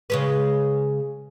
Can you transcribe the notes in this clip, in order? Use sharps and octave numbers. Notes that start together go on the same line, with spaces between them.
C#3 G#3 B4